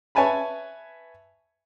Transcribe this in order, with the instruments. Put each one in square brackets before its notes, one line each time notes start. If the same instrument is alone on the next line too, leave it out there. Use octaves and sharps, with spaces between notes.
[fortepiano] B4 C#5 E5 G#5 A5 B5